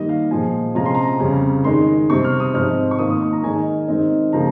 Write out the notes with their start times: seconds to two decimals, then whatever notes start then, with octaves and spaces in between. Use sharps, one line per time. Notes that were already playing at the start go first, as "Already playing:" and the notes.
Already playing: D#3 G3 A#3 D#4 D#5
0.09 F5
0.31 A#2 F3 G#3 G#5
0.75 C3 F3 G#3 C#4 F4 A#5
0.86 C6
0.95 A#5
1.20 F2 C#3 G3 C#4 F4
1.64 D#3 G#3 D#4 C6
2.10 C3 G3 C4 C#6
2.24 F6
2.40 D#6
2.54 G#2 F3 C4 D#4 F6
2.91 C#6
2.99 D#3 A#3 F4 D#6
3.10 D#6
3.22 C#6
3.32 A#5
3.43 D#3 G#3 D#4 G#5
3.88 D#3 G#3 C4 D#4
4.33 C#3 F3 A#3 A#5